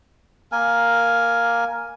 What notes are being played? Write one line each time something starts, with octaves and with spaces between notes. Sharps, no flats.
A#3 A#4 G#5